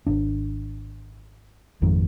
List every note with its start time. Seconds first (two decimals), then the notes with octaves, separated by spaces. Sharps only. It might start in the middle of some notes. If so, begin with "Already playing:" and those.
0.07 G#1 D4
1.82 G#1 F2 G#2 D#3